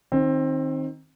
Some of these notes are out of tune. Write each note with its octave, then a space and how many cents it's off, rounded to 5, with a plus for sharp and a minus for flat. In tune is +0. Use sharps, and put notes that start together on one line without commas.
D#3 +0 C4 +20